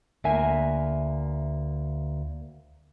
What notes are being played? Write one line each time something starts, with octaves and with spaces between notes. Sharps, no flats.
D2 A#3 E5 G#5